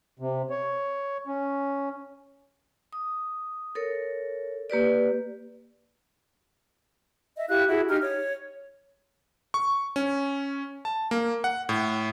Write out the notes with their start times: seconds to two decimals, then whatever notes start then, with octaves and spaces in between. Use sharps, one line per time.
0.19 C3
0.50 C#5
1.27 C#4
2.93 D#6
3.75 A4 A#4 C#5
4.70 A#3 G4 B4 D5
7.36 D#5 E5
7.48 E4 G4 F5 F#6
7.68 E4 F#4 G#4
7.89 D#4 G4 A#5 F6
8.02 C#5
9.54 C#6
9.96 C#4
10.85 A5
11.11 A#3
11.44 F#5
11.69 A2